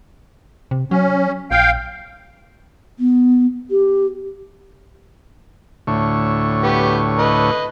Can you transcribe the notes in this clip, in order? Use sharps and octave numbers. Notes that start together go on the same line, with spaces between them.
C3
F#3 C#4
A#1 F5 G5
B3
G4
D2 A2 C#5
B3 G4
B4 D#5